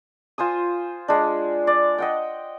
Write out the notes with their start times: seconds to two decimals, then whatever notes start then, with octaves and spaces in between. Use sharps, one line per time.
0.38 F4 C5 G#5 D#6
1.08 G#3 D4
1.67 D5
1.98 D#5 F#5 G5